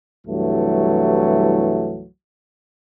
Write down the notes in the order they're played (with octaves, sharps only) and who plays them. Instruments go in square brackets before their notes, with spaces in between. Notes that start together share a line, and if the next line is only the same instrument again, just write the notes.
[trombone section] C2 G2 E3 F#3 A3